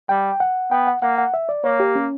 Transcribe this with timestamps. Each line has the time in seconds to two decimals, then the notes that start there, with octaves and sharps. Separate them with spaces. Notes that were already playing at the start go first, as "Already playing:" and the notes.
0.09 G3 G5
0.40 F#5
0.71 B3 G5
0.87 F#5
1.02 A#3 F#5
1.18 F#5
1.34 E5
1.49 D5
1.64 A#3 C#5
1.80 G4
1.96 C#4